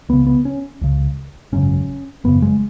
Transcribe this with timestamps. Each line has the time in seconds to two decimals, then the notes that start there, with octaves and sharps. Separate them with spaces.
0.09 C#2 C#3 B3
0.27 B3
0.45 C#4
0.81 C#2 C#3
1.52 G#1 F#2 C#3 C#4
2.24 G#1 F#2 C#3 B3
2.42 G#3